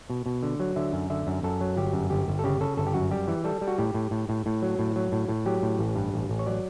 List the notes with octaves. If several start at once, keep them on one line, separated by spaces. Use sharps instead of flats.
B2
B2
D3
F#3
D3 E5
F#2
D3 E5
F#2
F#2 A4
F#3
G1 G4
F#2
G1 G4
G1
A4
C#3 G4
C#3 A4
G1 A4
G4
F#2 F#4
G3 G4
E3
G3 A4
G3
F#4
A2 G4
A2
A2
A2
A2
F#3
A2
F#3
A2
A2
F#3 G4
A2
A1
G2
A1
A1
C#5
F#3 D5